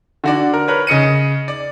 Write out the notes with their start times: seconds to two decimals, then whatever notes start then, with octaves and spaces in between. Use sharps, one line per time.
0.24 D3 F#4 D5
0.53 A#4
0.68 A#4 B4 C#5
0.87 C#3 D#5 C#7 D#7
1.48 D5